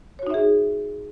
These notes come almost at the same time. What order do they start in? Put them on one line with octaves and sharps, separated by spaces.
C#5 F#4 D#4 E5 G#4